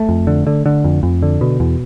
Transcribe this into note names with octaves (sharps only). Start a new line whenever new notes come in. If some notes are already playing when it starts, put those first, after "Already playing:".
Already playing: A3
F2
D3
D3
D3
F2
F2
D3
B2
E2